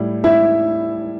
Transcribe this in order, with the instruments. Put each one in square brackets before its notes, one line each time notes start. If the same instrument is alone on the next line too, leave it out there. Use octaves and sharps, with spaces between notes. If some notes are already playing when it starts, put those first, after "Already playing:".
Already playing: [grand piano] A2 G3 E4
E4 E5